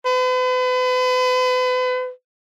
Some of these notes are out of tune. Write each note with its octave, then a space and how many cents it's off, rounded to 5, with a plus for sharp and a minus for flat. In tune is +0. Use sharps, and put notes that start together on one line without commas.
B4 +40